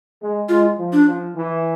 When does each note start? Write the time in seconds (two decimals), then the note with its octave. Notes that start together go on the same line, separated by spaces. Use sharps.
0.21 G#3
0.49 G#3 F4
0.78 F3
0.93 D4
1.07 F3
1.36 E3